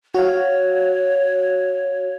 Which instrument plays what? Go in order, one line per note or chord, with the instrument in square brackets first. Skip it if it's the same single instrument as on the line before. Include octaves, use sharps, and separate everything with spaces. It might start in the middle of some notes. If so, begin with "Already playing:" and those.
[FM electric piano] F#4 F5 [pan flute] C#5